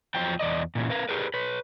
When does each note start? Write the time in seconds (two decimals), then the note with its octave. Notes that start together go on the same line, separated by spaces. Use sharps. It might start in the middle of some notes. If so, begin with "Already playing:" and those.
0.15 E2 F3 F#3 F4 C5 G5
0.39 E2 D5 D#5
0.75 A#2 E3 C#4
0.90 A#4 B4 F5
1.09 G4 G#4 A#4 B4
1.34 B4 C#5